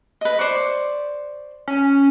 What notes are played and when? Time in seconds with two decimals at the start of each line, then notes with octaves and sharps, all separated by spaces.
0.21 B4 D#5
0.39 C5 D5 C#6
1.68 C#4